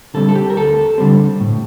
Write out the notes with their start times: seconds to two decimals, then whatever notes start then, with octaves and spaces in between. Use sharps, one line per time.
0.14 D3 G3 C4 A4
0.29 A4
0.35 G4
0.50 A#4
0.57 D2 A4
0.98 D3 G3 C4
1.40 A2